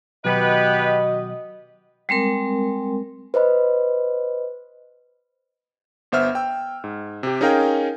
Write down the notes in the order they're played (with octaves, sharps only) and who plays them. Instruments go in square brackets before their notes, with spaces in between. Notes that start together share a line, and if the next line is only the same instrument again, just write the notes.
[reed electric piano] B2 D#3 F#3 [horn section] B3 G4 B4 [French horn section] F#4 D#5
[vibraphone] G3 G#3 C4 A#4
[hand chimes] B4 C5 D#5 B5
[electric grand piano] G1 B3 C5 E5 E6 F6
G5 E6
G#2
C3 G4
C#4 D#4 G#4 A#4 F5 G5